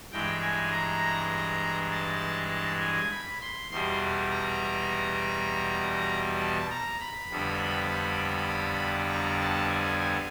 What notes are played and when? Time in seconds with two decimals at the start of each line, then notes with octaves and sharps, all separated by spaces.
0.12 G2 E3 G#3 G5
0.42 G#5
0.71 A#5
1.91 A5
2.81 G#5
3.11 B5
3.42 C6
3.71 E2 B2 G3 C6
4.31 A#5
6.40 A5
6.70 A#5
7.00 B5
7.30 F2 D3 G3 B3
9.10 A#5
9.40 A5
9.70 G#5
10.00 G#5